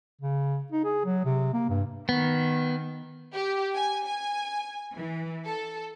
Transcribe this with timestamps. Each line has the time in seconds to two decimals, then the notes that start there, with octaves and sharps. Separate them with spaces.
0.21 C#3
0.72 D#4
0.84 G#4
1.05 F#3
1.25 C3
1.53 A#3
1.69 G2
2.09 D#3 B3
3.33 G4
3.76 G#5
4.06 G#5
4.96 E3
5.45 A4